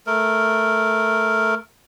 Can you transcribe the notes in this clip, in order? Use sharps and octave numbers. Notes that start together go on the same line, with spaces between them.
A3 A#4